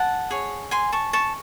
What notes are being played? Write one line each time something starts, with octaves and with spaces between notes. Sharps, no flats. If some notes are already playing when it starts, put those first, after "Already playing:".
Already playing: F#5 A5
G#4 C#5
G#5 C6
A5 C#6
A5 C#6